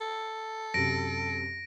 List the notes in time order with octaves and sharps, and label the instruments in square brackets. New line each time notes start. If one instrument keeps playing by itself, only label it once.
[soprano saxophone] A4
[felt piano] F#2 C3 [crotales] A#6 D7